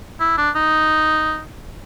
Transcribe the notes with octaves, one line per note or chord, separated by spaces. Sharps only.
E4
D4
D#4